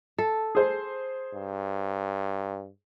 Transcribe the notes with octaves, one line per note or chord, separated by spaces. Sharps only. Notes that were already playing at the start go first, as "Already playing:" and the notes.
A4
G#4 C5
G2